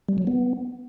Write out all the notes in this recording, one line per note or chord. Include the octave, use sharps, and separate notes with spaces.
G3
F#3
B3